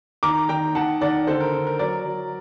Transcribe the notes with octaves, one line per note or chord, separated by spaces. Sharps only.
D#3 A#5 D6
D#3 G5 A#5
D#3 F#5 A5
D#3 D5 F#5
D3 A4 C5
A#4
D3
A#4
F#3 A#4 D5
F#3